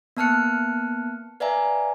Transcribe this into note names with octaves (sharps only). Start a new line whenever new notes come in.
A#3 B3 A5 F6 F#6 C#7
B4 D5 E5 F5 G#5 A#5